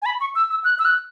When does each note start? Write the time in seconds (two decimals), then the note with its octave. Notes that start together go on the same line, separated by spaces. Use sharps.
0.02 G#5
0.06 B5
0.21 C#6
0.35 E6
0.50 E6
0.64 F#6
0.79 E6
0.85 F#6